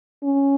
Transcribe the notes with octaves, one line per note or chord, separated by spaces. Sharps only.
C#4